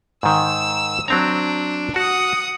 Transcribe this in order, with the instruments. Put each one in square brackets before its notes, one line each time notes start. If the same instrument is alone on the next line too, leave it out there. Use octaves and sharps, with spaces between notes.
[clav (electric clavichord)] G#2 D#3 [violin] E6
[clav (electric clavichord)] F#3 C4 A#5 [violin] D4
[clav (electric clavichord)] F#4 [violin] F#5 D#6